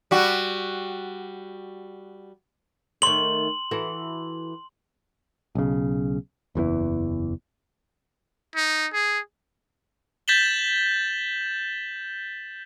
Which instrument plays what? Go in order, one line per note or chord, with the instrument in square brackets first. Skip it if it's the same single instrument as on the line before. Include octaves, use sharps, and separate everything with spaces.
[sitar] G3 F#4
[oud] D#3 A3 C#5 [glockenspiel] C6 F#7
[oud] E3 F#4 A4
[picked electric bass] B1 C#3
F#1 E2 B2 E3
[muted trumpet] D#4
G#4
[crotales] G6 A6 B6 E7 F#7 G7